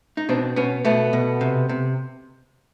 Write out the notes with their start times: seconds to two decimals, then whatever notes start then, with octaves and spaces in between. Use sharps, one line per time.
0.17 D#4
0.29 B2 C4 D4
0.56 B2 B3 C#4
0.85 B2 A3 B3
1.13 B2
1.41 C3
1.69 C3